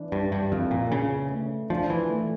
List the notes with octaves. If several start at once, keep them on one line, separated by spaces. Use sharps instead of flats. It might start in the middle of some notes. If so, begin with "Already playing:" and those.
Already playing: E3 D4
G2 D4
G2
F2 E3
A#2
C#3 D4
A3
F3 D4
E3
A3